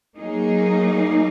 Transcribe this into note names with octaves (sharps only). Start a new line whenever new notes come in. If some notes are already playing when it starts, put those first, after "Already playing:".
F#3 A#3 D#4 G#4